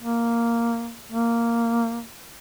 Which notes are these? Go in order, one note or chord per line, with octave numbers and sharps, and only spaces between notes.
A#3
A#3